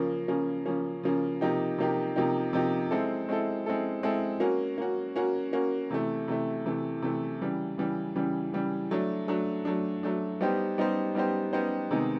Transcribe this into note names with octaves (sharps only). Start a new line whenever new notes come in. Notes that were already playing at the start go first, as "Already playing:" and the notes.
Already playing: C#3 F3 A#3 C#4
C#3 F3 A#3 C#4
C#3 F3 A#3 C#4
C#3 F3 A#3 C#4
C3 F3 A#3 D#4 G4
C3 F3 A#3 D#4 G4
C3 F3 A#3 D#4 G4
C3 F3 A#3 D#4 G4
G#3 C4 E4 A4
G#3 C4 E4 A4
G#3 C4 E4 A4
G#3 C4 E4 A4
A#3 C#4 F#4
A#3 C#4 F#4
A#3 C#4 F#4
A#3 C#4 F#4
C3 E3 A3
C3 E3 A3
C3 E3 A3
C3 E3 A3
C#3 E3 G3
C#3 E3 G3
C#3 E3 G3
C#3 E3 G3
F#3 A3 D4
F#3 A3 D4
F#3 A3 D4
F#3 A3 D4
G3 B3 D#4 G4 C5
G3 B3 D#4 G4 C5
G3 B3 D#4 G4 C5
G3 B3 D#4 G4 C5
C3 D#3 G#3 B3 D#4